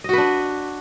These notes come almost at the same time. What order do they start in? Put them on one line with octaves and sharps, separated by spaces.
D#5 F#4 B4 D4